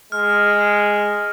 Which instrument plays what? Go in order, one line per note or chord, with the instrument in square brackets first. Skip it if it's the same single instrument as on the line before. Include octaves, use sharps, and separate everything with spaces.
[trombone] G#3 [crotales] F6